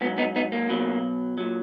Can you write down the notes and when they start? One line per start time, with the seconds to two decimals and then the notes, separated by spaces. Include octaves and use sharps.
0.01 G#2 B3
0.05 F#3
0.18 B3 D#4
0.36 B3 D#4
0.52 A#3
0.69 B2 F#3
1.38 A#2 F#3